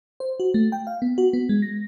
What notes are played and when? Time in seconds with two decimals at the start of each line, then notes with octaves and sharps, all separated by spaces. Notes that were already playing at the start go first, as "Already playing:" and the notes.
0.20 C5
0.40 F#4
0.54 A3
0.72 G5
0.87 F5
1.02 B3
1.18 F#4
1.33 B3
1.49 G#3
1.62 A#6